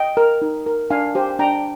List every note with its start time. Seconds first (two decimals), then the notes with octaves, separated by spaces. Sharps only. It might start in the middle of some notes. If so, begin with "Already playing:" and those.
Already playing: D#5 G5
0.17 A#4
0.42 D#4
0.66 A#4
0.90 D4 F5 G#5
1.15 G4 C5
1.39 D4 G5 A#5